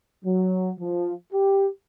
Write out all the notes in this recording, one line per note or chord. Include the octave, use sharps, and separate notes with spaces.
F#3
F3
G4